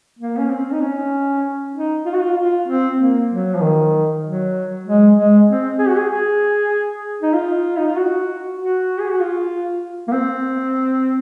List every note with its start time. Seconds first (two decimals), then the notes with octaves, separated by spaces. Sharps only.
0.19 A#3
0.39 C#4
0.50 C4
0.71 D#4
0.81 C#4
1.74 D#4
2.05 F4
2.13 F#4
2.21 F4
2.37 F4
2.68 C4
2.99 A#3
3.30 F#3
3.55 F3
3.60 D#3
4.23 F#3
4.85 G#3
5.16 G#3
5.47 C4
5.79 G#4
5.88 F#4
5.97 G#4
6.09 G#4
7.22 D#4
7.34 F4
7.78 D#4
7.87 F4
7.96 F#4
8.57 F#4
9.00 G#4
9.10 F#4
9.20 F4
10.07 A#3
10.12 C4